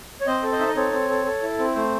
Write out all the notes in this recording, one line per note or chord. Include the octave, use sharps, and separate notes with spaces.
C#5
C4 C5 D#5
A4
C5 D#5
D#4 E5
D#5
C4 A4 C#5
C4
A4
A4
E4
C4
A3 C5